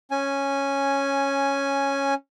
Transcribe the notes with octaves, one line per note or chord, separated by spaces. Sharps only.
C#4 G#5